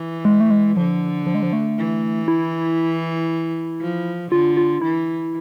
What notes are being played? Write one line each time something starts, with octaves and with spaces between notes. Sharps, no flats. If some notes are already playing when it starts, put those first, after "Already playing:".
Already playing: E3
G#3
A3
G#3
D3 F3
F3
G#3
F3
A3
E3
E4
F3
D3 F4
F4
E3 E4